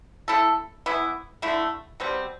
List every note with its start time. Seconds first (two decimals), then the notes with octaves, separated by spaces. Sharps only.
0.28 A3 E4 A4
0.86 E3 B3 E4
1.42 D3 A3 E4
2.00 B2 G3 C4